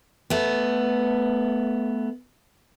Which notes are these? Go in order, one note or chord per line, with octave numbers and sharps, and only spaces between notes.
A3 B3